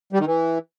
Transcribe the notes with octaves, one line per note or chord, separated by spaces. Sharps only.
G3
D#3
E3